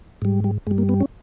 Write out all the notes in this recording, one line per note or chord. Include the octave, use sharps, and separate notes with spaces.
G#2 G3
G3
G2 G3 G#3
A#3
B3
C#4